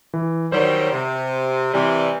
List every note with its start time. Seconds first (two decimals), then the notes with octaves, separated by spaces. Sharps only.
0.14 E3
0.52 D#3 F#3 G3 C5
0.92 C3
1.74 C3 E3 G3